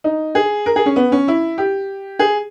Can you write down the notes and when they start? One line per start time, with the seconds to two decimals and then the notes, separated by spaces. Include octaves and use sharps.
0.04 D#4
0.35 G#4
0.66 A#4
0.76 G#4
0.86 C#4
0.96 B3
1.12 C#4
1.28 E4
1.58 G4
2.19 G#4